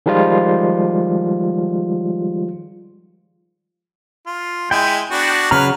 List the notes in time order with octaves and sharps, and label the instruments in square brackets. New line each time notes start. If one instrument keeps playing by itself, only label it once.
[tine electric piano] D#3 F3 G3 G#3 F4
[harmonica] F4
[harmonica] G#3 E4 [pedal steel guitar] G5
[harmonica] B3 D4 F#4
[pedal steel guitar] C#3 F#3 A#5 [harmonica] B4 F6